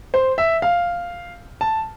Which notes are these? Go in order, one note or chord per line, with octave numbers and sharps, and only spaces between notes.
C5
E5
F5
A5